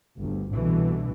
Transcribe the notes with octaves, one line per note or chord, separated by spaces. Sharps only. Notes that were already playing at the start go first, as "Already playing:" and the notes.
G1 D2 G2
C2 B2 D3 E3